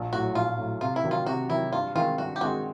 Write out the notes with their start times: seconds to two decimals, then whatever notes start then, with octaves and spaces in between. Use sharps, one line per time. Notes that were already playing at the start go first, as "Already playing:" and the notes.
Already playing: A#1
0.13 A2 F#3 F#4
0.35 A#1 F4
0.58 A2 F#3
0.81 C3 F4
0.96 E4
1.04 D#3 F#3
1.11 F4
1.26 C3 F#4
1.49 D#3 F#3 E4
1.72 G2 F4
1.95 D#3 G#3 C4 F4
2.18 G2 F#4
2.36 G4
2.41 D#3 G#3 C4 F#4